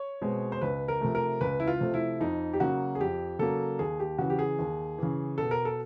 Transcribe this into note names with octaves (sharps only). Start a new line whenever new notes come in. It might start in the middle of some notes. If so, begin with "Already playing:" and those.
Already playing: C#5
B2 G#3 C4
C5
C#2 B4
A#4
C3 F3 A3
A#4
C#2 B4
E4
F4
C3 F3 A3
E4
F2 D#4
G4
C#3 F#3 A#3 F#4
G#4
F2 G4
C#3 F#3 A#3 A4
D#2 G#4
G4
C#3 E3 F#4
G4
G#4
D#2
C#3 E3
B2 A4
A#4
A4